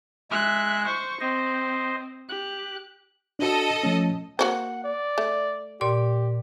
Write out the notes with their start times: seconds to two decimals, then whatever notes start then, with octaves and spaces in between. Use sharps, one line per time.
0.31 G#3 E5 F#6
0.86 C5 C#6
1.20 C4 C5 D#5
2.29 G4 F#6
3.39 D4 F#4 A4 D#5
3.83 F3 A3 C#4
4.39 A#3 F#4 C5 F#5
4.84 D5
5.18 A3
5.81 A#2 G4 D5 C6